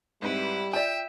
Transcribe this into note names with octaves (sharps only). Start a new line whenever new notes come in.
G#2 G3 C4 E4 B4
F4 D5 E5 G5